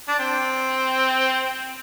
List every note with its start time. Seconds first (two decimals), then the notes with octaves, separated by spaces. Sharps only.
0.08 D4
0.19 C4